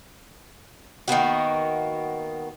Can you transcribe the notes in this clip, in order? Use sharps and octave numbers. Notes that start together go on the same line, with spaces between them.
D#3 A#3 B3 F#4